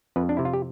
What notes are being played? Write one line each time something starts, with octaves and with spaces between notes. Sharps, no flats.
F2 B4
D4
C3 E4
F4
G4